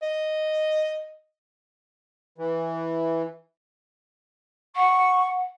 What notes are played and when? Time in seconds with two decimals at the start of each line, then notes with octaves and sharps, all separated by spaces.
0.02 D#5
2.38 E3
4.76 F#5 C#6